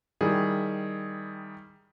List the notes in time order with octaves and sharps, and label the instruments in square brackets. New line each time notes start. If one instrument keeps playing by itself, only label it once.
[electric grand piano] D#3 G3 E4 G#4